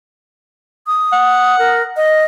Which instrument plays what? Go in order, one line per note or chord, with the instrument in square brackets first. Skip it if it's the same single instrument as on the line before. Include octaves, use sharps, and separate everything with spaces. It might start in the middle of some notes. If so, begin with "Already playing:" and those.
[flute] D#6
[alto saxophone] F#5
[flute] A#4
D#5